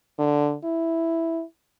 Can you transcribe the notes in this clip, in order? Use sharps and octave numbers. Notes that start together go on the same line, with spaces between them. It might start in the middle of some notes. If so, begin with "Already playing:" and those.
D3
E4